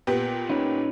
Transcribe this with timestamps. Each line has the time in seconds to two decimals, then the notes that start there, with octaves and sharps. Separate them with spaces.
0.07 A#2 B3 G4
0.50 C#4 D#4 B4